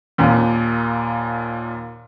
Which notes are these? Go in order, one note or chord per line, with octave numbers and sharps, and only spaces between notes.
D#2 A#2